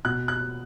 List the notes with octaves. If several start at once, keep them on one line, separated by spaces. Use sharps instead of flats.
B2 F#6
F#6